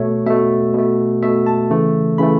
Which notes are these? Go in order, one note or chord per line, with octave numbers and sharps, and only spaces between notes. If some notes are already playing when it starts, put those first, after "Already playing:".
Already playing: B2 A3 C#5
B2 A3 E5
B2 A3
B2 A3 E5
A5
C#3 E3 A3
C#3 E3 A3 B5